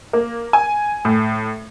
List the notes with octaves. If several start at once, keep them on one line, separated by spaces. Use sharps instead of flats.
A#3
G#5
A2